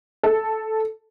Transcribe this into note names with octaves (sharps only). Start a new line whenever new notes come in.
A4